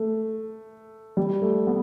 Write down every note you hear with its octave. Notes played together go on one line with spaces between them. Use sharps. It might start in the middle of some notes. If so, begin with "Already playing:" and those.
Already playing: A3
G3
A3
B3